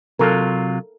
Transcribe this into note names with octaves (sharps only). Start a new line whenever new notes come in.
C3 F#3 F4 A4 A#4